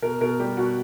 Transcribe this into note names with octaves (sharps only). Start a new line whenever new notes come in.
B2 A#4
B2 A#4
G3 G4
B2 F#4